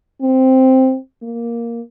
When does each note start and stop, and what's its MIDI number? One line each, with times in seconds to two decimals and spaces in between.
0.22 0.97 60
1.23 1.81 58